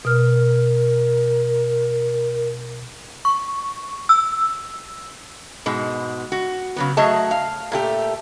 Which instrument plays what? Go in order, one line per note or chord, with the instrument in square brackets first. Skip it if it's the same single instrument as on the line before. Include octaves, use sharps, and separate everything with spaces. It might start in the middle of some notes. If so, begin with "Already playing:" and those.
[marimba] B2 F6 [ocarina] A#4
[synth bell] C#6
E6
[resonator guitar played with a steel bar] G#2 B2 G#3
F#4
C#3 F#3 B3
F#3 A3 G#4 D#5 A5
F5
A#2 A3 G4